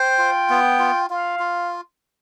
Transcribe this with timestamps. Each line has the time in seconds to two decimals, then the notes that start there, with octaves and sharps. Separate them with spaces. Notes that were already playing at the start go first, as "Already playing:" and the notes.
Already playing: C5 G5
0.19 F4
0.50 B3
0.79 F4
1.10 F4 F5
1.40 F4